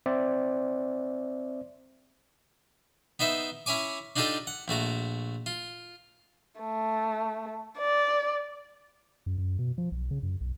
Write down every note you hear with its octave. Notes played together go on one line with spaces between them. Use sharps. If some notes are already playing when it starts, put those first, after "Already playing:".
C4 C5 D5 E5
B3 D#4 C5 E5
C#4 E4 C#5 G#5 D6
D4 D#4 F4 G4 A4 D#5
F#5
A#1 A3 F#4 A#5
F4
A3
D5
F#2
F#2
B2
F3
B1
C#3
F#2
B1